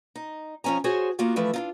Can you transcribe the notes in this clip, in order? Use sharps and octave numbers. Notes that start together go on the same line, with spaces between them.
D#4
F2 F3 C#4 G#5 A#5
F#4 G#4 C5 C#5 G#5
A#3 B3 F4 F#4
E3 F3 A3 B4
D4 D#4 F4